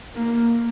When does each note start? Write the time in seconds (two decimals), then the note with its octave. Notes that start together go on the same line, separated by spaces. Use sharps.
0.15 A#3